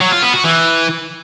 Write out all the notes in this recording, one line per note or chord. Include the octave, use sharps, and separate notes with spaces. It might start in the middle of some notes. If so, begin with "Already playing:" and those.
F#3
F4
B3
F#4
E3